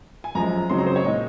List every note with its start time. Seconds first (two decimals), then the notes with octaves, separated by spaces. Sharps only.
0.24 G#5
0.35 F#2 F3 G#3 A#5
0.69 C#3 F#3 C4 D#4 C6
0.78 A#5
0.86 C5
0.96 C#5
1.04 A#2 G#3 D#4 D#5